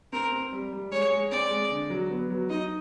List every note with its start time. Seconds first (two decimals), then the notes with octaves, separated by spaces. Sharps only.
0.12 C4 A#4
0.32 C4
0.52 G3
0.73 G3
0.91 G#3 C#5
1.11 G#3
1.31 C4 D5
1.51 G#3
1.71 D3
1.90 F#3
2.11 B3
2.30 F#3
2.50 D#4 D#5